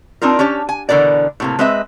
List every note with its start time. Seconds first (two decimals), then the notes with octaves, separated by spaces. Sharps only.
0.22 C4 D4 D#4 F4 A#4
0.39 C#4 D4 G4 C#5
0.69 G#5
0.89 B2 D3 E3 A#4 D5
1.40 A2 C3 A#3
1.59 G#3 C4 B4 D#5 E5